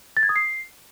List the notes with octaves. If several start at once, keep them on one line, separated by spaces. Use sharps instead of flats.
A6
G#6
D#6
C7